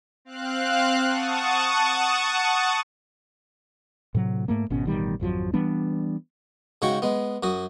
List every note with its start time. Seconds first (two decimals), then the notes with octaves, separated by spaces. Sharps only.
0.25 C4 F5 F#6
1.08 F#5 A5 C#6 D#6
4.15 A2 C3 F#3
4.48 G#2 A3 A#3
4.70 G#1 B2 C#4
4.85 A1 B2 D#3 G3
5.20 G#1 F2 F3 F#3
5.53 E3 G3 B3 D4
6.82 G#2 C#3 F#4 G5 C#6
7.02 G#3 B3
7.43 F#2 F#4 D#6